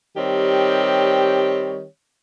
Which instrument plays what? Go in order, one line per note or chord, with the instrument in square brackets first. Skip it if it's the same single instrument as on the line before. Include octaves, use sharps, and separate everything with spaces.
[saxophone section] D#3 G3 C4 G4 C#5